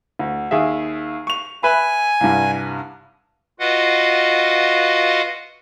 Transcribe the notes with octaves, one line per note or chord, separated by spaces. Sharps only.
D2
D#2 G#4 E5
C#6 F7
B4 E5 G#5 B5
C2 G2
F4 F#4 B4 D#5 F5 F#5